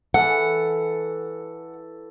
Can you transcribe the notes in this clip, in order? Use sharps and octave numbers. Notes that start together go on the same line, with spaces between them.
E3 A4 F#5